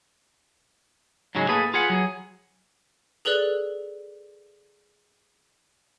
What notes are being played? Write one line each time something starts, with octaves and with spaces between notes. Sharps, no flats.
G#2 C#3 F#3 G#3
A2 A#3 G#4 A4 B4
F4 G#4 B4 F#5
F#3 G#4
G#4 A4 B4 D5 F#6